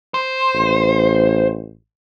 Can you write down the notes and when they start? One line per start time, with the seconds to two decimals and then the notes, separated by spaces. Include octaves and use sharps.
0.14 C5
0.54 A1